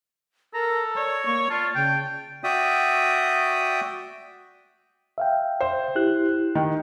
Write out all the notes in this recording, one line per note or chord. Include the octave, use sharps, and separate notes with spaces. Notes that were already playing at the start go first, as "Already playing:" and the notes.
A4 A#4 A#5
C#5 D5
A#3 C#6
F4 D5 A5
C#3 G5
F#4 D5 E5 G5 D#6
E5 F5 G5
C5
E4 G4 F#6
D#3